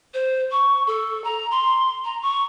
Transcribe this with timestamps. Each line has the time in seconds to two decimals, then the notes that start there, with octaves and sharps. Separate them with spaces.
0.14 C5
0.51 C#6
0.87 A4
1.24 A#5
1.51 C6
2.04 A#5
2.22 C#6